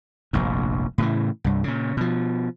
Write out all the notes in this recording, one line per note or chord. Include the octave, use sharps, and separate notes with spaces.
F1 A#1 G2
A2 C#3 E3
C2 G2
A#2 C#3
B2 F3